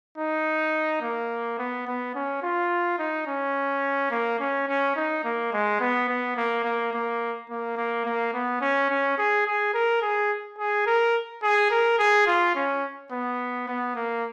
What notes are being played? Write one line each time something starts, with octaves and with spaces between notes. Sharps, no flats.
D#4
A#3
B3
B3
C#4
F4
D#4
C#4
A#3
C#4
C#4
D#4
A#3
G#3
B3
B3
A#3
A#3
A#3
A#3
A#3
A#3
B3
C#4
C#4
G#4
G#4
A#4
G#4
G#4
A#4
G#4
A#4
G#4
F4
C#4
B3
B3
A#3